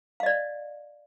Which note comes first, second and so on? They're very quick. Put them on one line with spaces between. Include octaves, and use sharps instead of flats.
F5 D#5 D5